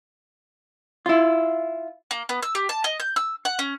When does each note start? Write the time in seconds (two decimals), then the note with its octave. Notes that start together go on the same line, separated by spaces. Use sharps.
1.06 E4 F4
2.11 A#3
2.29 B3
2.43 E6
2.55 G4
2.69 A5
2.84 D#5
3.00 G6
3.16 E6
3.45 F#5
3.59 C#4